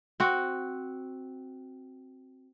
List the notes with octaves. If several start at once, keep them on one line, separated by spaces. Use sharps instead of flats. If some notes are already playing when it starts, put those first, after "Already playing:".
C4 F#4